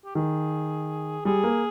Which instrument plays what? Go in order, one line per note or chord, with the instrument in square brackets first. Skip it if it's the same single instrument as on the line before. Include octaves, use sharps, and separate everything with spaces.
[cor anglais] G4
[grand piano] D#3 [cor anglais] G#4
[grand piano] G3 [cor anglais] G#4
[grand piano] A#3